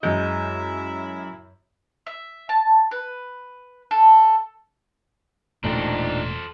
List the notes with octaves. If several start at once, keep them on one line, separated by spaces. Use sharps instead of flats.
F#2 G#3 E4 E5 G6
E5
A5
B4
A4
E1 A#2 A3 D4 D#4 A4 C5 G5